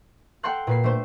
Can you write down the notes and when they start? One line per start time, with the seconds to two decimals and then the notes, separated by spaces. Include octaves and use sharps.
0.43 A4 F#5 G5 A5 C6 F#6
0.67 A#2 B4 C7
0.84 A3 D4 C5